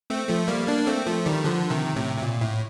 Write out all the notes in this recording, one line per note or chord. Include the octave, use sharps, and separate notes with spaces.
A3 C4
F3 A3
G3 A#3
A#3 D4
A3 C4
F3 A3
D#3 G3
D3 F3
C3 D#3
A2 C3
C3
A#2
A2